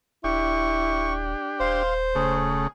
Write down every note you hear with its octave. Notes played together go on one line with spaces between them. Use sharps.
D#1 D4 E4 G4 C#6
D#1 C5 F5 C6
D#1 C#3 A3 G#4